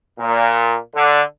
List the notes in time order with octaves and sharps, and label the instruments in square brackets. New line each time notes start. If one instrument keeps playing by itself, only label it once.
[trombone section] A#2
D3